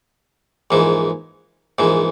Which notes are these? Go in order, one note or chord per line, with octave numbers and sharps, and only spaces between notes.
A#1 G#2 E3
A#1 G#2 E3